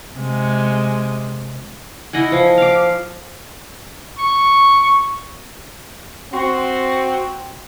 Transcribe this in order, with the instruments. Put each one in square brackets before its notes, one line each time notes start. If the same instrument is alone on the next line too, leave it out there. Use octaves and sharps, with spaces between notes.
[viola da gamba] C3 G#3
[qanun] E4 D#5 F#5 G#5
F3
F5 D6
[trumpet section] C#6
[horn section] C4 F#4